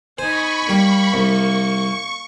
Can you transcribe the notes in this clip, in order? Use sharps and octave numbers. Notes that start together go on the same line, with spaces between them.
D#4 C5 G#5 B5 C#6
G3 A#3
C2 C#6